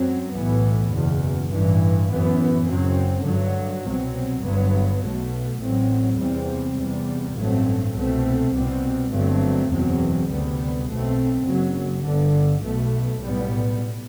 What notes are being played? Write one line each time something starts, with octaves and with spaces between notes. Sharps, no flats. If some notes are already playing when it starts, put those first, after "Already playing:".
Already playing: F#2 F#3 C4
B1 A2 E3 B3
F#1 E2 B2
A1 G2 E3
F#2 E3 B3
F#1 F#2 F#3 C4
G2 D3 F#3
C2 B2 F#3 C4
G1 G2 F#3 B3
B1 B2 A3
A1 A2 F#3 C4
E2 C3 G3 C4
E2 C3 G3
A1 G2 F#3 A3 C4
C2 B2 A3 C4
C2 B2 G3 C4
G1 G2 F#3 A3 C4
F#1 E2 B2 F#3 C4
D2 C3 G3 B3
B1 B2 A3 C4
F#1 F#2 F#3
G1 G2 D3
B1 B2 A3
B1 A2 G3 B3